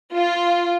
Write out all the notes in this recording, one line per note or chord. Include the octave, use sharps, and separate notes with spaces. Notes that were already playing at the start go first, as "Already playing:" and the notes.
F4